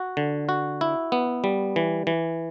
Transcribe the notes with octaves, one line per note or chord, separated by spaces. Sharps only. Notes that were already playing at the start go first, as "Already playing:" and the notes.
Already playing: F#4
D3
F#4
E4
B3
G3
E3
E3